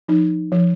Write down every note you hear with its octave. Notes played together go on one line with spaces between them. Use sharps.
F3 D#4
F3